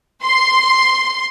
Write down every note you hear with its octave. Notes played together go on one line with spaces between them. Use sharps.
C6